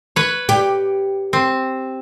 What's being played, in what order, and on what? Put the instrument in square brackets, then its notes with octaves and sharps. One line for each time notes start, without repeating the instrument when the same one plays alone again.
[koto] B4 C#5
[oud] G4
[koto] C4